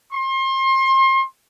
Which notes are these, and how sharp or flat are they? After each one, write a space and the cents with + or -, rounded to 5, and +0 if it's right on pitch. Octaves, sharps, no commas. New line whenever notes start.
C6 +35